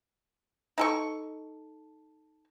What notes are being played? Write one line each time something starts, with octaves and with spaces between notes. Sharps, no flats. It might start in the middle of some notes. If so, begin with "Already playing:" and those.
D#4 A4 C#6